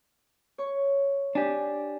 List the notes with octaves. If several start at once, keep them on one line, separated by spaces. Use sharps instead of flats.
C#5 C#6
D4 G4 G#5